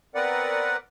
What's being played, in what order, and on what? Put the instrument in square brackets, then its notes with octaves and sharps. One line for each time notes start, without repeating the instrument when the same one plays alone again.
[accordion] B3 C4 A#4 B4 D5 F#5